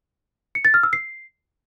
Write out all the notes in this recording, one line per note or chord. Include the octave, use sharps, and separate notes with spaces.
C#7
A6
F6
E6
C7